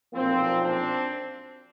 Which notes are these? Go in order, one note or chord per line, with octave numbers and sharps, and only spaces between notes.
B1 A#2 F3 A#3 C4
C4 D4